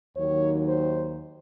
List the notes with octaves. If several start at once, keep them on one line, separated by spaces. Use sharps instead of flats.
D#2 D#3 F#3 C#5
C5